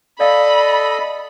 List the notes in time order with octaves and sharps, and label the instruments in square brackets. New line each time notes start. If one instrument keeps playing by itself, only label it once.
[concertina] A4 D#5 [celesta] D5 F5 [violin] B5